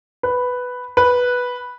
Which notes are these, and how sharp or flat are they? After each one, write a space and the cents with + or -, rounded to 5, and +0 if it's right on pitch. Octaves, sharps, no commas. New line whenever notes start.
B4 +5
B4 -5